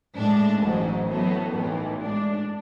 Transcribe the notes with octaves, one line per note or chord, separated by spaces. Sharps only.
A2 G#3 D4
A1 G#2 F#3
A2 F#3 B3
B1 A2 E3
A2 G#3 D4